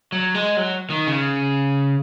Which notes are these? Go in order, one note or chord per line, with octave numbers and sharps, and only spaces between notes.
F#3
G#3
F#3
D#3
C#3